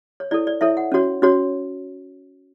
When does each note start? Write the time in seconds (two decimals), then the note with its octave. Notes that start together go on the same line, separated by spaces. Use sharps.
0.20 C#5
0.31 E4 A4 C#5 D5
0.47 D5
0.61 E4 A4 C#5 E5
0.77 F#5
0.92 C#4 F#4 C#5
1.22 C#4 F#4 C#5